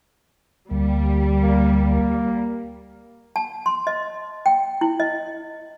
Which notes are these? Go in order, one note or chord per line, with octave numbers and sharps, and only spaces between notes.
D2 G3 A#3
A#3
A#3
A5
C6
D#5
G5
E4
D#5